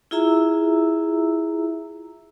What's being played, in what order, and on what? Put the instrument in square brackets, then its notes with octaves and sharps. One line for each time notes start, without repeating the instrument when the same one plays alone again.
[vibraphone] E4 F4 G#4 E5 A#5 E6